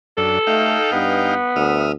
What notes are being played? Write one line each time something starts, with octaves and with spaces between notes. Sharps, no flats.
F#2 D4 A4
A3 D#4 F5 G5
G2 B3
D2 E5 D#6 F6